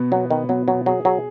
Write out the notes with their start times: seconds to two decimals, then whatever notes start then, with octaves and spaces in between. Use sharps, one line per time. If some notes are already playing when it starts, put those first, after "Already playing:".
Already playing: B2 B3 F#4
0.12 F#3 B3
0.30 D#3 B3
0.49 F#3 B3
0.68 B2 F#3
0.86 F#3 G#4
1.05 F#3 G#4